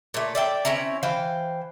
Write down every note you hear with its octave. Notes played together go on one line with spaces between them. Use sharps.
A#2 A3
D5 E5 G5
C4 C#4 E4 A#5
E3 C5 F5 G5